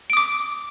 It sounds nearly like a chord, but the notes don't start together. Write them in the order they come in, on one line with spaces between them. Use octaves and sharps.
D7 D#6 D6